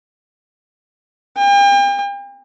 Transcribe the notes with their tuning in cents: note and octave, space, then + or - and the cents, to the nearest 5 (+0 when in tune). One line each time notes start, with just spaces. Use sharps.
G5 +40